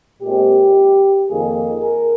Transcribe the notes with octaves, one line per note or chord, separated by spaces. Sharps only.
A#2 G#3 C4 G4
F2 D#3 A#3 G#4
A#4